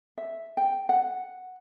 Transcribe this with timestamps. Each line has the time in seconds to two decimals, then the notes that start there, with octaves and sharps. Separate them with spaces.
0.18 E5
0.57 G5
0.89 F#5